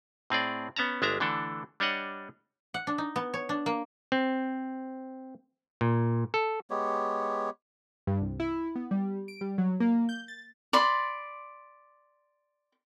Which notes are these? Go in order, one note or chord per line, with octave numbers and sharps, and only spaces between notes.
A2 C4 G#4 D5
B3 C#4 A5 A#5
G1 G#3 D4 E5 A#5
D3 E3 A3 D4 A4
G3 D4 C#5 D#5 F#5
F#5
D4
D#4
B3
C#5
D4
A#3
C4
A#2
A4
G#3 B3 G4 C#5
G2
C2
E4
B3
G3
D7
G3
F#3
A#3
G6
A6
D5 B5 C6